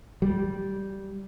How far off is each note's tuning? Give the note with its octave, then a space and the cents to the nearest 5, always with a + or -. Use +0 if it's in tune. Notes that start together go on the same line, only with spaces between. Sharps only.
G3 -10